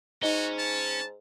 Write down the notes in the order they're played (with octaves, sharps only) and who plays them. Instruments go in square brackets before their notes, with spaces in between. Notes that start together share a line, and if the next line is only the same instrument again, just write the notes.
[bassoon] G#2 [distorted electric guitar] C#4 [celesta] D#4 D#5 G7 [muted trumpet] F#4
[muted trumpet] A5